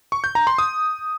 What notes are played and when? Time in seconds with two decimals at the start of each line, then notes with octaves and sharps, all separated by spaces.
0.12 C#6
0.24 G6
0.35 A#5
0.47 C6
0.58 D#6